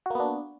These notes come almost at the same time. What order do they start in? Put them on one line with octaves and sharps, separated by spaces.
F#4 A#3 B3 D4